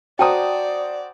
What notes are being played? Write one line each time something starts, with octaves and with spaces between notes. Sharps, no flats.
F#4 C5 D5 G5 A5 A#5 D#6